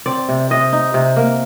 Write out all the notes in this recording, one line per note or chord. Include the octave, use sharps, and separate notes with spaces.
C4 D5
C3
C3 D#5
D#4
C3
A#3